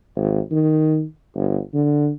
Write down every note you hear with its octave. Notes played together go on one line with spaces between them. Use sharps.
G#1
D#3
G1
D3